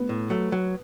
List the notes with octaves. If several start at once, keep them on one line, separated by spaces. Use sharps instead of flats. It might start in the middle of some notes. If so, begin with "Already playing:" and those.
Already playing: B3
A2
F#3 A3
F#3